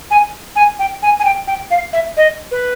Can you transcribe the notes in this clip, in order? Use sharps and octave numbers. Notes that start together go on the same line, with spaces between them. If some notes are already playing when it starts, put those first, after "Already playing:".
G#5
G#5
G5
G#5
G#5
G5
G5
F5
E5
D#5
B4